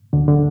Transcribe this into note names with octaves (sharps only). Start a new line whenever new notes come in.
D2 D3
D3